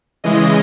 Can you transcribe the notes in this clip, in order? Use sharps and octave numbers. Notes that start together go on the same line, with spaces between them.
C#3 E3 G#3 D#5